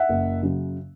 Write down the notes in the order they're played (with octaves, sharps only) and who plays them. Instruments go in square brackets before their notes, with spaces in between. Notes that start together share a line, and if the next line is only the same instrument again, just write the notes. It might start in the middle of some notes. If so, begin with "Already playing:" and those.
Already playing: [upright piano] E5 F#5
F#1
F#2 C#3 F#3